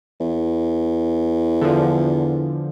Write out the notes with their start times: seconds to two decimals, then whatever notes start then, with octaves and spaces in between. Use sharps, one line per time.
0.20 E2
1.61 D3 F3